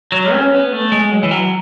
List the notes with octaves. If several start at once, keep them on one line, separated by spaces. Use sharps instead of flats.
F#3
C#4
B3
A3
G#3
F#3
E3
F#3